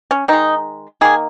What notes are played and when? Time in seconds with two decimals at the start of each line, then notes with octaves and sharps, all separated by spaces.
0.11 C#4
0.28 D#3 G#3 D#4
1.01 D#3 A#3 G#4